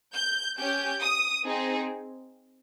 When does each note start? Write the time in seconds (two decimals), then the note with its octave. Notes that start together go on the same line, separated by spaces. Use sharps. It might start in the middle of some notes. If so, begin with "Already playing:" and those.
0.14 G6
0.58 C#4 G4 G6
1.02 D#6
1.45 C4 D#4 G#4